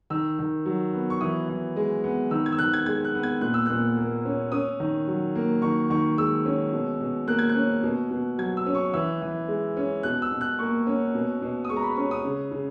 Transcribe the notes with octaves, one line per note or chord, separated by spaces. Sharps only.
D#3 E6
D#3
F#3
B3
C#6
E3 D#6
E3
G#3
B3
D#3 E6
G#6
E6
D#3 F#6
G#6
G#3 G#6
F#6
B3
G#6
A#2 F#6
E6
A#2 F#6
A#3
C#4
C#4 D#6
D#3
F#3
A#3
D#3 C#6
D#3 C#6
G#3 E6
C#4
B2
B2
A#3 F#6
G#6
F#6
C#4
B2
B2
F#3 G#6
E6
C#4
C#6
E3 E6
E3
G#3
C#4
B2 F#6
E6
B2
F#6
A#3 C#6
C#4
B2
B2
D#6
G#3 C#6
A#5
B5
C#4 C#6
D#6
C#3
C#3